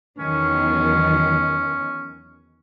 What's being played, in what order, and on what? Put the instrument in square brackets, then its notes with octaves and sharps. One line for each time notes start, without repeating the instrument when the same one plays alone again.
[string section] E2 D#3 F#3 [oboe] C#4